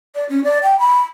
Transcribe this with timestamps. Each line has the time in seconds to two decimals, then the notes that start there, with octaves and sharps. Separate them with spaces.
0.15 D5
0.29 C#4
0.44 D5
0.63 G5
0.79 B5